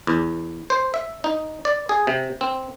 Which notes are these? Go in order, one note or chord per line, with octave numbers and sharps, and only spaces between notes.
E2
C5
E5
D#4
D5
G#4
C3
C4